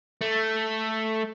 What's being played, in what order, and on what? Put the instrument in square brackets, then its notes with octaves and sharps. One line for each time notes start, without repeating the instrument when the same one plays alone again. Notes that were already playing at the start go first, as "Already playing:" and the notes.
[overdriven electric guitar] A3